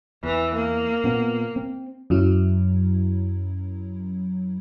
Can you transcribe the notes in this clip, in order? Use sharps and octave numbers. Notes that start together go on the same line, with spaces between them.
E2 E3
A#3
A#2 B3 C4
C4
F#2 F#3 E4